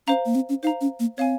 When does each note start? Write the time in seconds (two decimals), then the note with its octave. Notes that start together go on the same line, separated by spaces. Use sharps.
0.07 C#4 C5 F5 A#5
0.26 A#3
0.35 C4
0.49 C#4
0.63 D#4 C5 F5 A#5
0.81 C#4
1.00 A#3
1.18 C4 C#5 F5 G#5